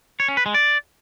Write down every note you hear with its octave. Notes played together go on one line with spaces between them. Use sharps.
C#5
C#4
B4
G#3
D5